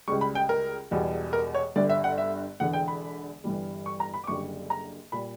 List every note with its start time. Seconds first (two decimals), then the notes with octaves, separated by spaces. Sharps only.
0.08 C#2 C#3 G3 C#6
0.21 B5
0.35 G5
0.49 A#4
0.91 E1 E2 B2 G3
1.33 A#4
1.55 C#5
1.76 G1 G2 D3 D5
1.89 E5
2.04 F#5
2.18 E5
2.60 E1 E2 D3 F#5
2.73 G5
2.88 B5
3.44 G1 G2 E3 G3
3.86 C#6
4.00 A#5
4.14 B5
4.24 D6
4.27 F#1 F#2 D3 G3 C#6
4.70 A#5
5.12 A#2 G3 B5